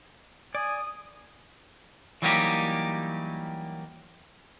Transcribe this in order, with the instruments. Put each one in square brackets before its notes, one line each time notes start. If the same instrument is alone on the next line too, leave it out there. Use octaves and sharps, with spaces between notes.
[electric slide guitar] D5 [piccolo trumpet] G#5 [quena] D#6
[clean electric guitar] E3 F#3 G3 A#3 D#4 G4